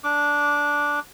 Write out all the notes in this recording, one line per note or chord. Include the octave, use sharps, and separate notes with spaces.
D4 D6